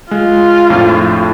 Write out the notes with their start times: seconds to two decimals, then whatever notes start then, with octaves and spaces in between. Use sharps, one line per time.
0.11 G#3 F4
0.70 F2 A2 D4